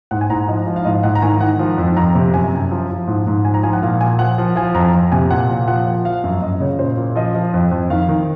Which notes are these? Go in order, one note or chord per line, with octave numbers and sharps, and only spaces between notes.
G#2 F#5
G#5
G#2 A#5
F3 D#5
F3
F5
G#2 D#5
G#2 F#5
A#5
D#3 G#5
D#3 F#5
F3
F2
F2 A#5
C3
F#2 G#5
F#2
F3
F3
G#2
G#2
F3 G#5
A#5
F3 G#5
F#5
A#2 F5
A#2 G#5
F3 F#5
F3
F3 G#5
F2 A#5
F2
C3 G#5
A#2 F#5
A#2
F3 F#5
F3
F3 F5
F#2
F#2 D#5
C#3 C#5
A#2 C5
A#2
F3 D#5
F3
F2
F2
D#3 F5
D#3